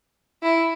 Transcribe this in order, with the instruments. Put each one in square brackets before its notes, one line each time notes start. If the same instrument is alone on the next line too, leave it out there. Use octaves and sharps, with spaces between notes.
[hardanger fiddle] E4